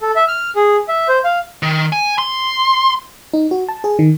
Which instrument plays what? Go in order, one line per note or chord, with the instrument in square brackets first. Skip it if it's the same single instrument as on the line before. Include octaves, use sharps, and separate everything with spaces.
[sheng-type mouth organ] A4
E5
F6
G#4
E5
C5
F5
[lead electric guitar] D#3
G#5
C6
[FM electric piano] D#4
F#4
A5
G#4
D#3